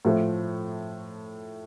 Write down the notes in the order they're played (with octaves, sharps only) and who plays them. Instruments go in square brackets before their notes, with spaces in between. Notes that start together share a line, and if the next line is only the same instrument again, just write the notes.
[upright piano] A2 F3 A3